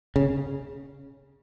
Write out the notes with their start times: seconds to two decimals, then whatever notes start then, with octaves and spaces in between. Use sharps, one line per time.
0.16 C#3